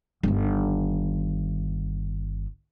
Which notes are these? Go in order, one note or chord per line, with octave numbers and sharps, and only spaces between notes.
G1 D#3